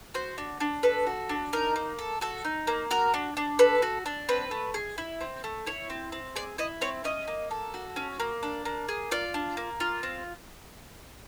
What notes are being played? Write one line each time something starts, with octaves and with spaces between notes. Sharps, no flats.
F#4 C5
D4
D4
A4 B4
F#4
D4
D#4 A#4
A#3
A4
F#4 A4
D#4
A#3
F#4 A#4
D4
D4
A4 B4
F#4
D4
C4 B4
A3
G#4
E4
C4
A3
E4 C#5
C4
C4
G#4 D5
E4 D#5
C4 C#5
C#4 D#5
A#3
A4
F#4
C#4
A#3
D4
A#3
G#4
F4 D5
D4
A#3
F4
C4